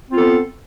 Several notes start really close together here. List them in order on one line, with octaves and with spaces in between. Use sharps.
C4 F4 B3 A4